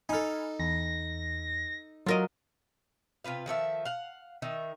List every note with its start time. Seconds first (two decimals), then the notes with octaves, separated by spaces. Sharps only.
0.09 D#4 A4 G#5 B5 F6
0.59 E2 A#6
2.06 F#3 F4 A#4 D#5
3.24 C3 F4 B4 F5
3.46 D#3 F3 A4 E5
3.85 F5 F#5
4.42 D#3 D#4 E5